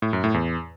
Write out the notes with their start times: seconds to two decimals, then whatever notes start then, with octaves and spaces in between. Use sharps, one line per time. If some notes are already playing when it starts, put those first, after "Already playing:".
0.02 A2
0.13 F#2
0.24 A2
0.34 E2